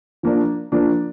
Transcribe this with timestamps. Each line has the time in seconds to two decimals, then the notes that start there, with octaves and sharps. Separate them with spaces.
0.23 F3 A#3 D4
0.72 F3 A#3 D4